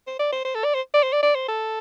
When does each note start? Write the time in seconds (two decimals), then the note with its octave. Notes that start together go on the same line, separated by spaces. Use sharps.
0.07 C5
0.19 D5
0.32 C5
0.45 C5
0.55 A4
0.64 D5
0.74 C5
0.93 D5
1.03 C5
1.12 D5
1.23 D5
1.35 C5
1.48 A4